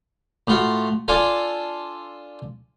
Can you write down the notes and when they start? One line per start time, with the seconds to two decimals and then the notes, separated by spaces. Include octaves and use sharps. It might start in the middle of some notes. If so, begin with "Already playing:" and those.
0.47 A2 F4 F#4
1.08 D4 F4 A4 G#5